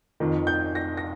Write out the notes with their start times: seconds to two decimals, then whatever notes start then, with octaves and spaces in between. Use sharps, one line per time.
0.20 F2 D#3
0.47 G6
0.75 A#6
0.97 A#6